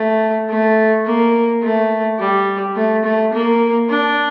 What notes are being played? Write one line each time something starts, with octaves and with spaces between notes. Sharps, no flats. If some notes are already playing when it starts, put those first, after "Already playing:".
Already playing: A3
A3
A#3
A3
G3
A3
A3
A#3
D4